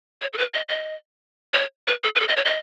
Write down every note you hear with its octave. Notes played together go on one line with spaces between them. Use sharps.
C#5
A4
B4
D#5
D#5
C#5
B4
A4
B4
A4
D#5
C#5
D#5